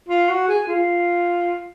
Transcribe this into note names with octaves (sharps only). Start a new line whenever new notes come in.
F4
F#4
G#4
F4